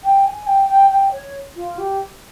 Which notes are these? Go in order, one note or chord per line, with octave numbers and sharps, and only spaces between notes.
G5
G#5
G5
G5
G5
C#5
F4
G4